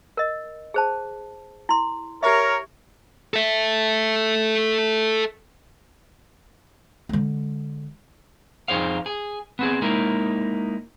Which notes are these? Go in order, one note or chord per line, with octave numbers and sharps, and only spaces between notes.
A#4 D#5
G#4 C5 A5
E4 C6
G4 A#4 C#5 E5
A4 E5
D3 G#3
F2 D#4 G#4 C5 F5
G#4
B3 C4 G#4
G#3 A#3 D#4 E4 A#4